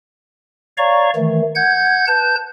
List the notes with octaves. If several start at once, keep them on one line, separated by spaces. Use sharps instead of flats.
C#5 D5 F5 A#5 C#6
D#3 E3 A3
F#5 G6 G#6
B4 A5 G6